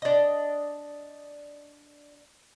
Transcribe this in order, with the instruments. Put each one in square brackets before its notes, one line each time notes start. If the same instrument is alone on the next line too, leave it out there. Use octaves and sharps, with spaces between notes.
[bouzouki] D4 D#5